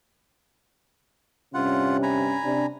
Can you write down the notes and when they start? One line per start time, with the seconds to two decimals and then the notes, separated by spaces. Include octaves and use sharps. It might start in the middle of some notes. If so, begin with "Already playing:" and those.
1.54 G2 C3 C#4 F4 F#5
2.03 G#5 A#5 B5
2.44 C3 D4